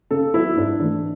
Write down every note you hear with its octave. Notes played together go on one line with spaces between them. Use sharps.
C#3 A4
F#3 B3 E4
G#2 D4
E3 A3 D4